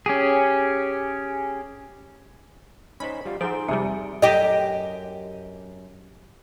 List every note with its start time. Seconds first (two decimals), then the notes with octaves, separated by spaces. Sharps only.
0.06 C#4 G4 G#4
3.00 C#4 D#4 C5 B5
3.25 G3 F4
3.41 F3 D#4 G#4 C5 F#5 A#5 D7
3.68 F2 C3 G3 G#4 E5
4.22 F#2 G4 D#5